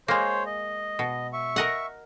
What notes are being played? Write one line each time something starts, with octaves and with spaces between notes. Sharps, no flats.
G#3 A#3 C5 C#5
D#5
B2
E5 C#6
A#4 D#5 F#5